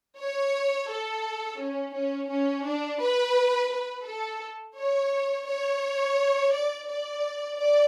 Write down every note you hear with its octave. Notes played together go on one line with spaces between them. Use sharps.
C#5
A4
C#4
C#4
C#4
D4
B4
B4
A4
C#5
C#5
D5
D5
D5